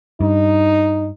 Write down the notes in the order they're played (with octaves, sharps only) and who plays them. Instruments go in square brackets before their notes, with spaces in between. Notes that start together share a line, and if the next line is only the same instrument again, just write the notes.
[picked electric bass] G2 [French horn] D#4